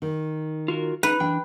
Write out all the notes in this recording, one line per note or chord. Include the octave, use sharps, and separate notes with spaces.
D#3
F4 F#4 A#4
D#4 B4
E3 D4 G5